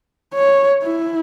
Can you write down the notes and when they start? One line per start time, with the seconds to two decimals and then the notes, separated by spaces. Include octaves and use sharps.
0.34 C#5
0.83 E4